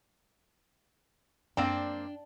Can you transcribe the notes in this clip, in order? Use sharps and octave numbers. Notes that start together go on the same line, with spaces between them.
F#2 A#3 C4 D4 D5 G5